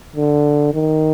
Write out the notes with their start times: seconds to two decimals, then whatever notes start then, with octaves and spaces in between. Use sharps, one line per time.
0.16 D3
0.74 D#3